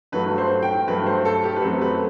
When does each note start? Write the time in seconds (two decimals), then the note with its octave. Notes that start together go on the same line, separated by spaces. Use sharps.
0.12 G2 F#3 A3 B4
0.38 C5
0.62 G5
0.87 G2 F#3 A3 B4
1.06 C5
1.25 A4
1.44 G4
1.56 B4
1.62 F#2 F#3 A3 C4 A4
1.81 B4